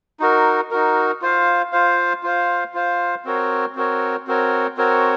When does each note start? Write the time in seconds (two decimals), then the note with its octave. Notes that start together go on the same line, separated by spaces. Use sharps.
0.20 D#4 F#4 A#4
0.71 D#4 F#4 A#4
1.22 F4 C5 F5
1.72 F4 C5 F5
2.23 F4 C5 F5
2.74 F4 C5 F5
3.25 C4 F#4 A#4 C#5
3.75 C4 F#4 A#4 C#5
4.27 C4 F#4 A#4 C#5
4.77 C4 F#4 A#4 C#5